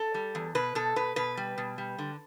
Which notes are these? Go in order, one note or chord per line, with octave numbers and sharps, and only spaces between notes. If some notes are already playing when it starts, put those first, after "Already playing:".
Already playing: A4
G3
E2
B2 B4
B2 A4
B2 B4
B2 B4
G3
B2
G3
D3